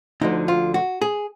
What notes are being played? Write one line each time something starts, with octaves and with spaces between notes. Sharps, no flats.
D2 D3 F3 D#4
F4
F#4
G#4